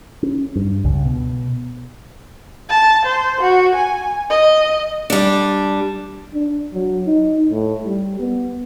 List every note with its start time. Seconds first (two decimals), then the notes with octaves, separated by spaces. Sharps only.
0.23 C#4
0.56 G2
0.84 C#2
1.05 B2
2.69 A5
3.05 C5
3.41 F#4
3.76 G#5
4.30 D#5
5.10 G3 D4
6.34 D4
6.74 F#3
7.06 D#4
7.50 A2
7.84 G3
8.19 B3